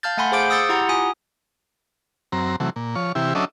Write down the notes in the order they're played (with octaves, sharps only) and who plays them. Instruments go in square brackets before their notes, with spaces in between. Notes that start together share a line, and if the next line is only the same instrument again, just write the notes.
[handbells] F5 A5 F6 G6 A6
A3 F#5 G#5 B5 C6 G6
G#4 C5 F5 D6 G6 D7
D#6 E6 G6 A6 C#7
E4 G4 F#5 A#5 C6
F4 G#5 D#6
[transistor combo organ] F#2 C4 A#5
C3 E3 F#3 A3
A#2
F3 C#5
C3 E3 E4 G4
F#3 C#4 D4 A4 D#5 E5